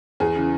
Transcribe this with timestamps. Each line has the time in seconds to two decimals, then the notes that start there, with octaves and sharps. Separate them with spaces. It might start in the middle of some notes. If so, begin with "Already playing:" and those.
0.20 E2 G#4
0.35 C#3 E3